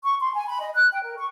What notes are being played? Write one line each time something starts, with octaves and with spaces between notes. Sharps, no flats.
C#6
C6
G#5
B5
D#5
F#6
G5
A#4
C#6